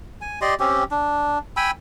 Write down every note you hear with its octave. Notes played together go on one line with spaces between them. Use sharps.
G#5
G4 D5 D#5 C6
C4 C#4 G4
D4
G5 G#5 B5 E6